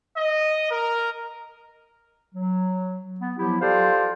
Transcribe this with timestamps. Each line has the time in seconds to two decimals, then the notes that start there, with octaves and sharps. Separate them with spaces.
0.16 D#5
0.71 A#4
2.35 F#3
3.20 B3
3.37 F3 F#3 B3 E4 G4
3.61 F4 G4 A4 C5 D5 F5